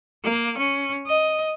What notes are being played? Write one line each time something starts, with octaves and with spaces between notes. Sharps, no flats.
A#3
C#4
D#5